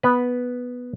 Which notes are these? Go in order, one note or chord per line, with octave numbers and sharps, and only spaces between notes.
B3 B4